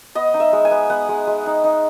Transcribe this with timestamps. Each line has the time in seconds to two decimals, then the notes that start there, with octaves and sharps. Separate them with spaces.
0.15 B3 D#5
0.34 D#4
0.40 E5
0.53 G#3
0.65 G#5
0.71 B3
0.90 B3 F#5
1.09 G#3
1.27 G#3
1.46 D#4
1.64 D#4